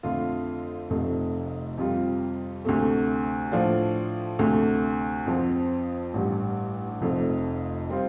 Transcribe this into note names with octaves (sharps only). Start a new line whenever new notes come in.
F2 D3 A3 F4
F1 F2 C3 A3
F2 C3 G3 F4
D2 C3 A3
A2 F3 D4 F4
D2 C3 A3
F2 F3 C4
A1 G2 G3
F1 F2 F3 A3
G3 C4 F4